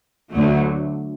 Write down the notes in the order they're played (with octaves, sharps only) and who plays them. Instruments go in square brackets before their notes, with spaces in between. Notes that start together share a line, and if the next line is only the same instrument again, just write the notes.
[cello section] D2 D3 F#3 A3